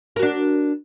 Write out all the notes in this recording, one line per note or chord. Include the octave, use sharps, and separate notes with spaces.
D4 F#4 A#4